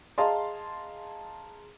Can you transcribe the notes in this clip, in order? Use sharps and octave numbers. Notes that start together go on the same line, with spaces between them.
G#4 D#5 F5 A5 A#5 C6